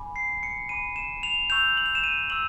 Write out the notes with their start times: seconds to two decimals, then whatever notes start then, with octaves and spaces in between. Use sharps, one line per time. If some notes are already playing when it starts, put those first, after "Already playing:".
Already playing: G#5 B5 D6
0.16 C7
0.43 C#7
0.69 G#5 B5 D6 D#7
0.96 E7
1.23 F7
1.50 C#6 E6 G6 F7
1.77 F#7
1.86 F7
1.95 E7
2.04 D#7
2.30 C#6 E6 F#7